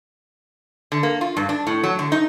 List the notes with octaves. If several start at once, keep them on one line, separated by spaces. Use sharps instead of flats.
D3
A#3
F4
G2
D4
A2
F#3
D3
D#4